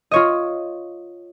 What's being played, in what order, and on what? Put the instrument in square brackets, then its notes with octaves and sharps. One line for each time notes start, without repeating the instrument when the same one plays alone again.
[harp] F4 C#5 D#5